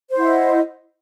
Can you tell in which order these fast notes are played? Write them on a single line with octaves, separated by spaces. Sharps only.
C5 E4 F#5 D#5